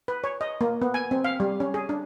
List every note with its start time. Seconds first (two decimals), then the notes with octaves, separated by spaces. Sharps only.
0.08 B4
0.24 C#5
0.41 D#5
0.61 A#3
0.82 B3
0.94 G#5
1.11 C4
1.24 F5
1.40 G3
1.60 C#4
1.74 G#4
1.89 D4